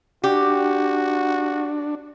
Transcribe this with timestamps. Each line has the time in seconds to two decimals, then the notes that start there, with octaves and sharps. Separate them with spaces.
0.24 D4 F#4 G4